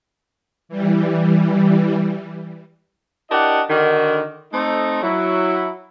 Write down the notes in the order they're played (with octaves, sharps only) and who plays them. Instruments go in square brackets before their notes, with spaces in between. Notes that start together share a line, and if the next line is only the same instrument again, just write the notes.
[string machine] E3 G3
[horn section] D4 E4 G4 A#4 D#5 F#5
D3 D#3 F#4
A3 C4 D#4
F#3 E4